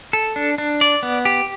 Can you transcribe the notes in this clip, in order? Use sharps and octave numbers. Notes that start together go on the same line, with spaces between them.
A4
D4
D4
D5
B3
G4